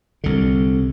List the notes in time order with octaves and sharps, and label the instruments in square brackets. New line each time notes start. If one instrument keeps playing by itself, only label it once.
[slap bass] C2 D3